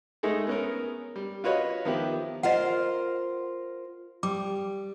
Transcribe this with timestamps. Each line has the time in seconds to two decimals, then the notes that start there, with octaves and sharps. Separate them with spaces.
0.23 G#3 A3 D#4 G#4 A4
0.47 B3 C#4 A#4
1.16 G3
1.44 F4 F#4 B4 C#5 D#5
1.85 D#3 F3 B3 E4 G4
2.43 F4 A#4 C5 D#5 F#5
4.23 G3 D6